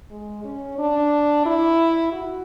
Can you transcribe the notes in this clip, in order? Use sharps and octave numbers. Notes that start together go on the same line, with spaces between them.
G#3
C#4
D4
E4
F#4